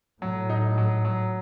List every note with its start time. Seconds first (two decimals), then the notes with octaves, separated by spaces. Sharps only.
0.21 A2 F#3
0.50 D#4
0.78 F#3
1.05 F#3